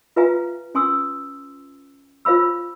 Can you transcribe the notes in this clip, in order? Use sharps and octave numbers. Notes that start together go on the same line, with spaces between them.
F4 B4 E5 F5 G#5 A#5
C#4 G#5 C6 D#6 E6
F4 C5 F5 B5 E6